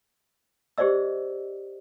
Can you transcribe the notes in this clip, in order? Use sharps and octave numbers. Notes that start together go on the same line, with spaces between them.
G4 G#4 C5 D5 D#5 E6